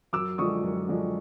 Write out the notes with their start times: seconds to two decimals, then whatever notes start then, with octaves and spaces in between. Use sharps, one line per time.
0.13 F#2 D6 E6
0.38 D3 F3 G#3 C#6 D#6
0.64 F#2
0.89 D3 F3 G#3